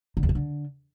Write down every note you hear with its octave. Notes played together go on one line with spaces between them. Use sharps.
D3
E2
C#3
D3